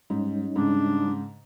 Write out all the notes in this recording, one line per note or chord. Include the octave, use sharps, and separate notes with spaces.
G#2 G3 C#4 D#4
G#2 C#3 D4